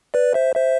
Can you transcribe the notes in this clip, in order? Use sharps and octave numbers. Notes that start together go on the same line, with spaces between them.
B4 D5
C5 E5
C5 E5